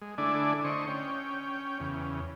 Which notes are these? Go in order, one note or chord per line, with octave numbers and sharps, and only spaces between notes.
G#3
D3 A3 D4 E4 D5 G#5
D3 C5 D#5 C#6
C#4 G5
E2 C#3